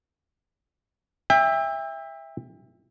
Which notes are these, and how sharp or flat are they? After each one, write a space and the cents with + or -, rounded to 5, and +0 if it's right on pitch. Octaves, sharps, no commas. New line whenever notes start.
E5 +0 G5 +35